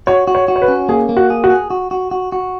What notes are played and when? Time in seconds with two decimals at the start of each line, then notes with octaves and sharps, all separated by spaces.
0.07 F#4 C#5
0.27 F#4
0.35 C#5
0.48 F#4
0.56 C#5
0.62 B4
0.68 C#4
0.89 A#3 G#4
1.09 A#3
1.17 F#4
1.30 G#4
1.44 F#4
1.50 G#4
1.70 F#4
1.91 F#4
2.11 F#4
2.32 F#4